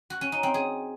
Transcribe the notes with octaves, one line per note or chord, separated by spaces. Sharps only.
F#4
C#4
D#4
C4
G#4